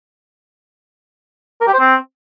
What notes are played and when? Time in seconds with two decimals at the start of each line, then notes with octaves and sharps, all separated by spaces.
1.61 A#4
1.67 G4
1.73 C5
1.80 C4